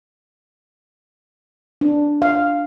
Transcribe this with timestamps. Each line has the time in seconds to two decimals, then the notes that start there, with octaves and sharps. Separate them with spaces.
1.81 D4
2.22 F5